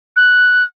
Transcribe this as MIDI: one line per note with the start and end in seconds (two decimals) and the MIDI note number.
0.16 0.64 90